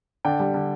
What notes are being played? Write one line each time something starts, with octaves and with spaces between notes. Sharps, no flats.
D3 D5 G5
G3
D3